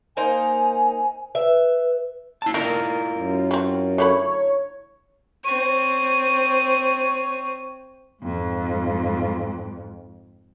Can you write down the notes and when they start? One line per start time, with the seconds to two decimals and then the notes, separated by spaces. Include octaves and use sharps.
0.17 A#3 D#4 C5 G#5
1.35 B4 E5
2.42 E4 A5
2.54 D#3 E4 F4 A#4
3.13 F#2
3.51 F#3 C4
3.98 D3 A3 C#5 B5
5.45 C4 C#5 D#7
8.23 F2 G#2